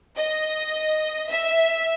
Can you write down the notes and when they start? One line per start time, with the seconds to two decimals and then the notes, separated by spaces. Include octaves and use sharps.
0.17 D#5
1.30 E5